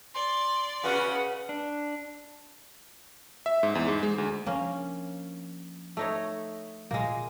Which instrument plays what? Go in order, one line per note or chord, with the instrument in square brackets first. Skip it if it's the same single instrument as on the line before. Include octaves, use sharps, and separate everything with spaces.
[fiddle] D5 [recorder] C6
[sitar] C#3 B3 F#4 [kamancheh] B4 [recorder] F#5
[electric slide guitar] D4
[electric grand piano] E5
G#2
E2
G#2
G#3
D2
[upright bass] F3 D4 [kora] A#3 C#4
[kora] A3 D#4 C#5
[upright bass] A#2 D#3 [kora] G#3 A#3